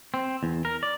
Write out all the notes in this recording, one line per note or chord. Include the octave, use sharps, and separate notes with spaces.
C4
E2
A#4
D5